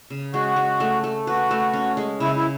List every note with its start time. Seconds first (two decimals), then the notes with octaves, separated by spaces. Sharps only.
0.10 C#3
0.34 G#3 F#4
0.56 G#3
0.80 A3
1.04 A3
1.27 F#4 B4
1.51 A3
1.73 C#4
1.97 G#3
2.20 C#3 E4
2.35 E4